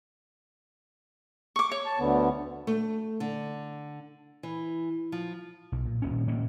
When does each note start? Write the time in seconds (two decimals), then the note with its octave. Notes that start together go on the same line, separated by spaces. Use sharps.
1.56 C#6 D6
1.72 C#5
1.86 A5
1.99 D2 D3 B3
2.67 A3
3.20 D3
4.43 E3
5.12 F3
5.72 B1
5.85 A#2
6.02 D#1 A#2 C#4
6.27 D2 A#2 A#3 C#4